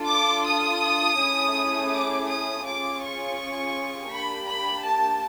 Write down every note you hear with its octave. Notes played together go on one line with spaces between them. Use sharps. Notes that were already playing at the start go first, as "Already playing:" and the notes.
Already playing: D4 F4 A4
D6
D#6
A3 C#4 E4 G#4
D6
D#6
C#4 F4 G#4 D6
C#6
A#3 D4 G4 B5
B5
A5